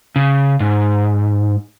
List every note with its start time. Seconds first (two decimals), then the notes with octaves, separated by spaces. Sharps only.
0.16 C#3
0.60 G#2